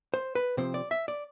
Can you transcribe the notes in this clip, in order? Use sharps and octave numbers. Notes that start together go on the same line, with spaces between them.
C5
B4
C3 F3 C4 C5
D5
E5
D5